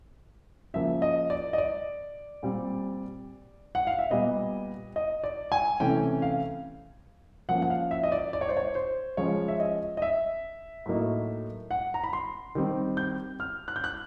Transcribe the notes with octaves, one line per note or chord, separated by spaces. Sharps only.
C#3 F3 A#3 E5
D#5
D5
D#5
D5
A#2 G3 C4
F#5
F5
E5
A#2 G3 B3 D#5
D#5
D5
G#5
C3 E3 A3 C#4 G5
F5
F3 A#3 C#4 F#5
F#5
F5
E5
D#5
D5
D5
C#5
C5
C#5
C5
C#3 F3 G#3 C#4 C#5
E5
D#5
D#5
E5
A2 F#3 A#3 D#4
F#5
A#5
B5
C6
D#3 G3 C4
G6
F6
F#6
G6
F#6